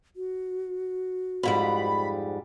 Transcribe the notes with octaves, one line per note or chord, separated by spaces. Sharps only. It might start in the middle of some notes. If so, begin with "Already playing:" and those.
F#4
F2 G#2 G3 B5